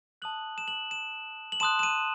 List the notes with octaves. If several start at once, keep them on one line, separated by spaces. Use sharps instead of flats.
A5 D#6 F#6 F#7
E7
F#7
E7
F#7
A5 C6 D#6 F#6 E7
E7
D#7